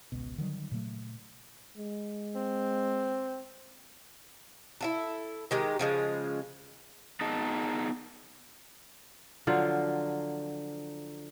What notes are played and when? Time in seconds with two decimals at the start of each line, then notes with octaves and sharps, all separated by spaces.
0.12 G#1 C#2 B2
0.38 D3 D#3 F#3 G3
0.72 A#2 C#3 F#3 A3
1.77 G#3
2.35 C4
4.81 E4 F4 A4
5.51 D#3 G#3 G4
5.79 C#3 F3 G#3
7.21 B3 D#4 G#4 A#4 D#5 A5
9.47 D3 F3 F#3 F4